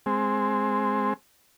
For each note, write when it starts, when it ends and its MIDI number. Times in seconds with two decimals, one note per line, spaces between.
0.06 1.13 56
0.06 1.13 60